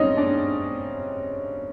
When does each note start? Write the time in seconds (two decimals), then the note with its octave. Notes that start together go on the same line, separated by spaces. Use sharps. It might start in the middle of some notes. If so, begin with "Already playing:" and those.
Already playing: F#2 C#3 G3 C4 C#4 D#4 D#5
0.17 D4 D5